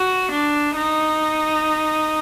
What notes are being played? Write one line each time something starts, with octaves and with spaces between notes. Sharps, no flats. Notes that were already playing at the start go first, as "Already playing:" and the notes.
Already playing: F#4
D4
D#4